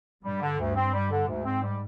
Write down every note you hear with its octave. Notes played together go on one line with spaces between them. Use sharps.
G2 G3
D3
D2
C4
G3
D3
D2 G#2
C4
G3